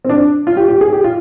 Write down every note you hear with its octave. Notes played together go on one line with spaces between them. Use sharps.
C4
D4
F4
G4
G4
G#4
G4
F4